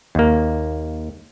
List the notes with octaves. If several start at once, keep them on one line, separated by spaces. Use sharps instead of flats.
D#2 A#3